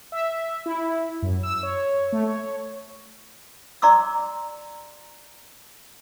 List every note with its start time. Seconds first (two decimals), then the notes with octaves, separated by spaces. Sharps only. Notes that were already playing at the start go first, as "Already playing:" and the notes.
0.12 E5
0.66 E4
1.22 F#2
1.43 E6
1.63 C#5
2.12 A3
2.27 C#5
3.82 D5 A#5 C6 D6 E6